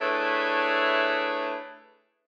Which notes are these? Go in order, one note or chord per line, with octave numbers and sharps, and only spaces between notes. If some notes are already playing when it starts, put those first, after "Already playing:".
A3 D4 E4 G#4 B4 C#5